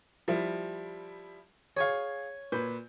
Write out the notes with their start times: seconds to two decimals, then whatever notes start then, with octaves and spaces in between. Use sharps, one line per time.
0.28 F3 G3 E4
1.77 G#4 C#5 F5 G#5 C#6
2.52 A#2 B4 G6